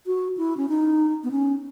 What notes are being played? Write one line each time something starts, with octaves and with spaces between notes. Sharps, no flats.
F#4
E4
C#4
D#4
B3
C#4